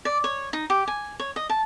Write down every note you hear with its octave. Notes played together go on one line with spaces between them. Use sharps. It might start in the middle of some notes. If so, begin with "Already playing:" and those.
D5
C#5
D#4
G4
G#5
C#5
D#5
A5